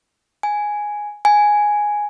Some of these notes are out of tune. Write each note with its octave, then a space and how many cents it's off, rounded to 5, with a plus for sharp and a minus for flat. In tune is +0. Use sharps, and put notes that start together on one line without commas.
G#5 +0
G#5 +0